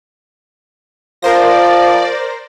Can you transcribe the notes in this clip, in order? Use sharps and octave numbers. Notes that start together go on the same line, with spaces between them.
F3 A#4 C5 D5 A#6